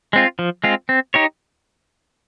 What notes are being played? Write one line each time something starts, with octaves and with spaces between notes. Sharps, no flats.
G#3 C4 F4
F3
G#3 C4 F4
C4
D#4 G4 C#5